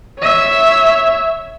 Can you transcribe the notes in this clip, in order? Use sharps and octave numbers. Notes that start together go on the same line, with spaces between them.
C#5 E5